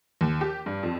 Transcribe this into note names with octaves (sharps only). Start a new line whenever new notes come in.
D#2
G4
G2
F2